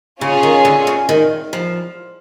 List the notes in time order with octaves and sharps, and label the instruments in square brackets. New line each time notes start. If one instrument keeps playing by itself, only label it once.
[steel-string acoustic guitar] C#3 [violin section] C#4 F4 G#4 C#5
[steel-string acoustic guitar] D#3
D3
C#3
D#3
F3